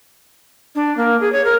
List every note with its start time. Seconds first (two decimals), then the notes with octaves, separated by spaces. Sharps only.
0.75 D4
0.97 A#3
1.21 G#4
1.32 C#5
1.45 A#4